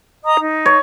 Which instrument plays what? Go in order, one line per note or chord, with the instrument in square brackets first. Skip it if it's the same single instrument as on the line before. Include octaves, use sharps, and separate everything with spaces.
[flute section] D#5 A#5 D#6
D#4
[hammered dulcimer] C#5